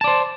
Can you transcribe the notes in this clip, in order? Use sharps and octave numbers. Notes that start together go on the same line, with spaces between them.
C5 D5 A5